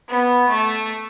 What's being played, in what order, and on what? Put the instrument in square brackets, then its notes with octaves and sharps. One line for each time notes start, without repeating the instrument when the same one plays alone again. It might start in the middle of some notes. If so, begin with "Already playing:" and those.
[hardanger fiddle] B3
A3